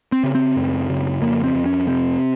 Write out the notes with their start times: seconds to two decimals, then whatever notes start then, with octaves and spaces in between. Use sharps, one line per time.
0.12 C4
0.23 C#3
0.35 C4
0.56 F#2
0.89 C#3
1.21 F2 A#3
1.44 C4
1.55 F2
1.66 C#4
1.87 C3 C4